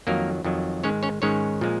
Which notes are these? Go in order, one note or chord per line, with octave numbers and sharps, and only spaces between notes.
F2 D#3 F#3 A#3 A#4
F2 D#3 F#3
G#2 D#3 G#3 C#4 C#5
C#4 C#5
G#2 D#3 G#3 C#4 C#5
A#2 F3 G#3